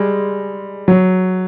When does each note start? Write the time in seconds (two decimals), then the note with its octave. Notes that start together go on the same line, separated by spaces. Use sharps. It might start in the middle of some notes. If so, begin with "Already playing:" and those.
Already playing: G3 G#3
0.88 F#3